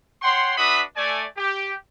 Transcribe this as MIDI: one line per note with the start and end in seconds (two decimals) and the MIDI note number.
0.22 0.54 73
0.22 0.54 78
0.22 0.54 79
0.22 0.54 84
0.57 0.82 62
0.57 0.82 66
0.57 0.82 71
0.57 0.82 76
0.57 0.82 83
0.57 0.82 87
0.96 1.25 57
0.96 1.25 74
0.96 1.25 80
1.37 1.73 67